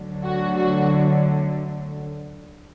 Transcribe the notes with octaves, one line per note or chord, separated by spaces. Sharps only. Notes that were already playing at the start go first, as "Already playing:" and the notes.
Already playing: D2 D3 F#3
F#4
F#4